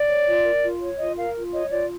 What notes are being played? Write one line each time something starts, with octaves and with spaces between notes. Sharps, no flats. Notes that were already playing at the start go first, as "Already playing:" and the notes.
Already playing: D5
C#5
F4
A#4
F4
C#5
F4 D#5
A#4 F5
F4
C#5 D#5
F4 D5